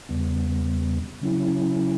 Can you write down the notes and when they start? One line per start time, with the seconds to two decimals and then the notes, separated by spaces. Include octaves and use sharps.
0.09 E2 C#3 G3 B3
1.21 C#3 F#3 C#4 E4